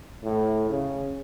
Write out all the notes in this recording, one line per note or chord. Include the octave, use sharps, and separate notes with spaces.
A2
C#3